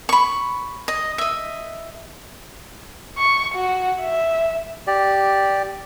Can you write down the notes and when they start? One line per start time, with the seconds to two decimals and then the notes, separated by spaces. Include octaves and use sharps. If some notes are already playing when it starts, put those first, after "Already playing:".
0.09 B5 C#6
0.88 D#5
1.18 D#5 E5
3.18 C#6
3.54 F#4
4.01 E5
4.87 G4 D5